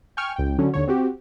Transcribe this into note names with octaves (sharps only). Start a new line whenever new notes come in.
G5 G#5 C#6 F6 G#6
C#2 G5
D3 F#3 C#4
D#2 D3 C#5
C4 F#4 G4